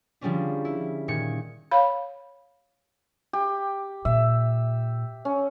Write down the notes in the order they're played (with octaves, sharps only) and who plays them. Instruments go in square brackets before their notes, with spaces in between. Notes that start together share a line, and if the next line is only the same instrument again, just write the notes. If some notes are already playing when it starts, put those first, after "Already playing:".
[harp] D3 F3 G3 G#3 C#4 D4
E4
A#2 D#3 G#6 C#7
[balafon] C#5 F5 B5
[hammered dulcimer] G4
[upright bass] A#2 [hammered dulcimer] E5
[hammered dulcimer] C#4